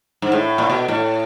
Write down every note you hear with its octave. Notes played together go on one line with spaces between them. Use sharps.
G#2
A2
A#2
B2
A2